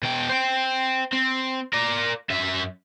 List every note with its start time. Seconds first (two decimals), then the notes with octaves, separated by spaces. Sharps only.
0.03 B2 G5
0.30 C5 G5
1.12 C4
1.73 A#4 D5
2.30 F#2 E5